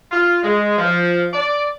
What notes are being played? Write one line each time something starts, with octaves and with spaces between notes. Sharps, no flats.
F4
G#3
F3
D5